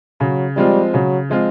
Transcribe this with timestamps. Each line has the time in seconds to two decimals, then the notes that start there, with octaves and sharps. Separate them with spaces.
0.20 C#3 F#3
0.56 F3 G3 G#3 C4 F4
0.93 C#3 F#3
1.29 F3 G#3 C4 F4